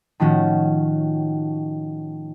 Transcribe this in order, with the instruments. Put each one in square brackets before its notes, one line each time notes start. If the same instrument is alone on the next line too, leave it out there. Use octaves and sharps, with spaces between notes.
[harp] A2 D#3 F3 C#4 F#4